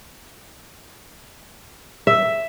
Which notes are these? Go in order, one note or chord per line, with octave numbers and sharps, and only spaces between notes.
E5